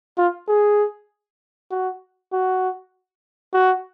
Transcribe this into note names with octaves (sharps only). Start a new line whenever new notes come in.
F4
G#4
F#4
F#4
F#4